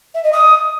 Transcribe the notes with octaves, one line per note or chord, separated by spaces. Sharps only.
E5
D#5
D#6